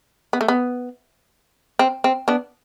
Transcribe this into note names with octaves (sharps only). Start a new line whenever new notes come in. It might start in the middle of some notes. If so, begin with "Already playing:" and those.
B3
A3
B3
C4
C4
B3 D4